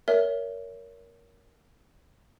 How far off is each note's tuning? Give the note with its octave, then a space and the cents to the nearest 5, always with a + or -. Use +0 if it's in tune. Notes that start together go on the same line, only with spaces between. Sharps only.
A#4 +5 C#5 +25 E5 +0